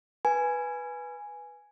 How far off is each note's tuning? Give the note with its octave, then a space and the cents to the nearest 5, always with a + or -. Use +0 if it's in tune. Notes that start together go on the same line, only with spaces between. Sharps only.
B4 -5 G#5 +0